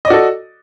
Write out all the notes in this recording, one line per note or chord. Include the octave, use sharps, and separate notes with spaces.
F#4 A4 D5 D#5